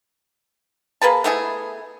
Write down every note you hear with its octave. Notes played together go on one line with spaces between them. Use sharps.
A#3 G#4 B4 A5
A3 B3 E4 G#4